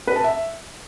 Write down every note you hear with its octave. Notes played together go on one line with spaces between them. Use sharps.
B4
A5
E5